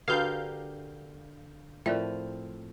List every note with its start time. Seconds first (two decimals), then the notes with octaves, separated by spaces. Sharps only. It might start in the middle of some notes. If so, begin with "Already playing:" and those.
0.08 D3 D4 F#4 G4 A#4 B4 F5 G6
1.86 A2 F3 C4 A#4 D5 E5